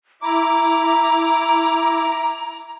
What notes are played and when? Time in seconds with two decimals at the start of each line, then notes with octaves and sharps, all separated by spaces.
0.22 E4 A#5 D6